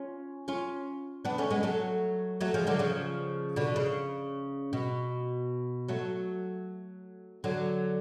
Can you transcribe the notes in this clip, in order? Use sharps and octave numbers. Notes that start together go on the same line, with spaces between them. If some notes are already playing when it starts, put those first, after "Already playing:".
Already playing: C#4 F4
C#4 F4
B3 D4
A3 C#4
G#3 B3
F#3 A3
F#3 A3
F3 G#3
D3 F#3
C#3 F3
B2 D3
C#3
B2
F#3 A3
D3 F#3